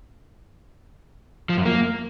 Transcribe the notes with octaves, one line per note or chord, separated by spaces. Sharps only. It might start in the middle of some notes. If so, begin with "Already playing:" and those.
F3
F#2
A#3